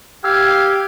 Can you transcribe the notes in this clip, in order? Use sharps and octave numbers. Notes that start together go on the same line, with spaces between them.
G4 F5 E6 G#6